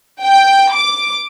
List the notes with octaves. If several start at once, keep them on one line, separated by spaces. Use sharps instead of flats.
G5
D6